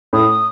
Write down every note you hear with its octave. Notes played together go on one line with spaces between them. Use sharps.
A2 D#6